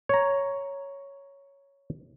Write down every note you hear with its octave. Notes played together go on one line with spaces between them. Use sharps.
C#5 A#5